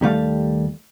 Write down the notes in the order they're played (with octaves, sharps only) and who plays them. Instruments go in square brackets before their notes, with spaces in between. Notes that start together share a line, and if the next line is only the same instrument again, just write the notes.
[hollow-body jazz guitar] D#2 G3 A3 F5